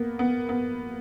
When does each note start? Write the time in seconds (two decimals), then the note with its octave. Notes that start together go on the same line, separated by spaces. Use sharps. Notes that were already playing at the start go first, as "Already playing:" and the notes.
Already playing: A#3 B3
0.19 B3
0.49 B3